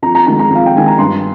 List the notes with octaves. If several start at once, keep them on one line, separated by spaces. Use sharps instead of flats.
F2 A#5
A#5
D#3 G#3 A#5
A#5
F2
F5
G5
D#3 G#3 G#5
A#5
G2 C6